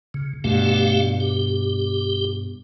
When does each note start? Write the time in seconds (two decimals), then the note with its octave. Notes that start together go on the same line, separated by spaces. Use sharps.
0.14 C#3
0.44 G2 B2 A3 G4 F5
1.20 G4